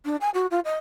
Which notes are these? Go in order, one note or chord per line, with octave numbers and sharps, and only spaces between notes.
D4
G#5
F#4
F4
D#5